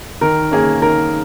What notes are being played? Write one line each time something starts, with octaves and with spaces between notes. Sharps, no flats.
D#3 A#4
A#3 C#4 G#4
D#3 A#4